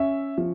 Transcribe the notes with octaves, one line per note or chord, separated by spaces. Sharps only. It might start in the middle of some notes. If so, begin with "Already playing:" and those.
Already playing: C#4 E5
F3